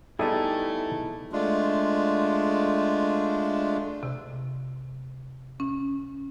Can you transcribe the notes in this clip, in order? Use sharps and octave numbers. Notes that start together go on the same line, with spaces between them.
G3 A3 B3 D#4 E4 G#4 A4
G#3 A3 D4 F4
C3
C#4